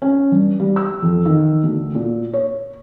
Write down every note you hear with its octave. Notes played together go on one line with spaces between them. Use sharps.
C#4
G2
G3
E6
F2
D#3
D2
A#2
C#5